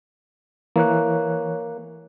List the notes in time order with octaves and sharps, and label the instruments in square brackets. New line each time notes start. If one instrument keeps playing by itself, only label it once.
[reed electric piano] E3 C#5 F#6 [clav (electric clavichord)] A#3